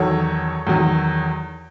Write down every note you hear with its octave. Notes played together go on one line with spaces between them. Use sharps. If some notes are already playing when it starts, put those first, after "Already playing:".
Already playing: E2 D#3 F#3 A4 C#5
E2 D#3 F#3